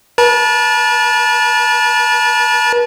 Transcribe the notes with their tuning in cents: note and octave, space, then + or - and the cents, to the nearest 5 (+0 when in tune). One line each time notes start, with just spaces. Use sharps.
B4 -45 A5 -15